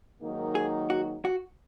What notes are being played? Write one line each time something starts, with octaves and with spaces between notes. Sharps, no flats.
G#2 D#3 F#3 A#3 D#4
G#4
F#4
F#4